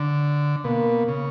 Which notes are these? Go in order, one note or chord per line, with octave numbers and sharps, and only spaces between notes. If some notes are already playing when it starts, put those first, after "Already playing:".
Already playing: D3
B2 A#3
C#3